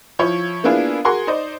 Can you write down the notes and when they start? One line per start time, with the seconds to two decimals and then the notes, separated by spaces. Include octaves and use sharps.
0.19 F3 E4 C#5
0.64 A#3 B3 D4 E4 F4 G#4
1.05 F#4 G#4 A#4 C6
1.27 D#4 C5 D5 D#5